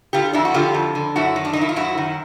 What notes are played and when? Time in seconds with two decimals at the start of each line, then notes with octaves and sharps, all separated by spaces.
0.13 D3 F4 G4
0.33 F2 D4 E4
0.45 F#4
0.54 D3 F4 G4
0.74 F2
0.95 D3
1.16 F#2 E4 F#4
1.36 D#3
1.45 D4
1.53 D#4
1.56 D#3 E4
1.69 F4
1.76 F#2 E4 F#4
1.98 D#3